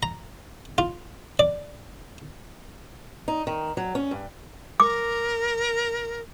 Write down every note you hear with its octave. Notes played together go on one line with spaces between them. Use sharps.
A#5
F4
D5
D#4
D#3
F#3
C#4
G2
A#4 D6